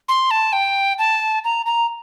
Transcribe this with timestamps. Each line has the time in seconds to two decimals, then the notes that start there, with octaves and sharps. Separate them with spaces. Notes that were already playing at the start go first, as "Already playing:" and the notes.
0.09 C6
0.31 A5
0.53 G5
0.99 A5
1.44 A#5
1.66 A#5